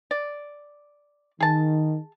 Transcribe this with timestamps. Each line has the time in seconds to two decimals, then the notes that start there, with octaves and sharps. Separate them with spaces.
0.11 D5
1.40 D#3 G#4 A5